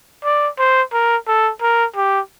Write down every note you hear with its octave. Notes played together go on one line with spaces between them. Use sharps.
D5
C5
A#4
A4
A#4
G4